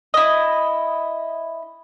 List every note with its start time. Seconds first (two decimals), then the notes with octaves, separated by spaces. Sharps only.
0.14 E4 D#5